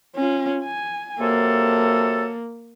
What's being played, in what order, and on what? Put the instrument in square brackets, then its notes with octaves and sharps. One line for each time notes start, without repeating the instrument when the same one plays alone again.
[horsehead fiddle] C#4 F4
G#5
[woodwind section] C3 F#3 A4 [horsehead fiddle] A#3